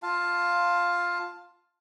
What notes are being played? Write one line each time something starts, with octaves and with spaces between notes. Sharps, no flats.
F4 F5 A5